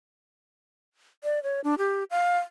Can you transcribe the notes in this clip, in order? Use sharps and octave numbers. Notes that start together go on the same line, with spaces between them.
D5
C#5
D4
G4
F5